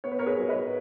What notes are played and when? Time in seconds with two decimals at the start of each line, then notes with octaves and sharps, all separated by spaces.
0.04 B3 C#5
0.11 B4
0.19 A#4 C#5
0.26 G#4 B4
0.38 F#3 C#5
0.49 B4 D#5